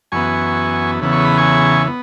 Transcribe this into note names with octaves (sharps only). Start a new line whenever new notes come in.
F#2 E3 B3 G#5 C#6
E2 C#3 E3 B3
C#6
B5
G#5 C#6
B3